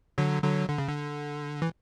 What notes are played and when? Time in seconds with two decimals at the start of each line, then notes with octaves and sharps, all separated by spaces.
0.18 D3 F#3
0.43 D3 F#3
0.69 D3
0.78 C#3
0.88 D3
1.62 E3